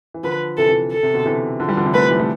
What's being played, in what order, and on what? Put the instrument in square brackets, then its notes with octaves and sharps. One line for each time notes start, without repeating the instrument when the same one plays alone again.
[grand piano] E3
[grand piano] D3 F3 [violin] B4
[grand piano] C3 E3 [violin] A4
[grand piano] C3 E3
[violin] A4
[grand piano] C3
B2 D3
C3 E3
D3 F3
E3 G3
D3 F3
C3 E3
[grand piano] F3 A3 [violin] B4
[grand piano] E3 G3
F3 A3